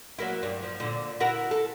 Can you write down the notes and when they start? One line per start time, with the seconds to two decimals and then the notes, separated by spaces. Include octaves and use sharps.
0.18 F#3 A#3 E4
0.43 G2
0.63 F3
0.80 A#2 D3
1.20 E4 F#4 A#4
1.51 A4